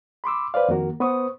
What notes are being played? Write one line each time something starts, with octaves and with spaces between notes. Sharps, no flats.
B5 C6 D6 E6
B4 C5 D5 F5
F2 D#3 A#3 F#4 A#4
B3 B4 C5 C#6 D#6